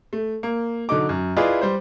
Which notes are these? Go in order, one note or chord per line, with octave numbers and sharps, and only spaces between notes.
A3
A#3
D3 F#3 D#4 D6
F#2
E4 F4 G#4 B4 D5 D#5
G3 C5